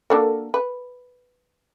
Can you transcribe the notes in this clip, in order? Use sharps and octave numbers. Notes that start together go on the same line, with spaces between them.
A#3 D4 F#4 A4 A#4
B4